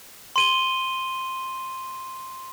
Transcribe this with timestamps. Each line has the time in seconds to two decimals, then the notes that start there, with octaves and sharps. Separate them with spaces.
0.36 C6 D#7 G7